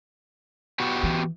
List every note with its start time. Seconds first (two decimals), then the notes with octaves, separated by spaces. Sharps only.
0.80 B3 F#4 G4
1.03 E3